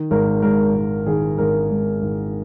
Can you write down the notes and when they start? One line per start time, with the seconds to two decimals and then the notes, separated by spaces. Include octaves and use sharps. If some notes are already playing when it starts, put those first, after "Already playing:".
Already playing: D#3
0.11 G#1 A#4
0.42 G#2 A#4
0.75 G#1
1.06 D#3 G#4
1.38 G#1 A#4
1.70 G#2
2.02 G#1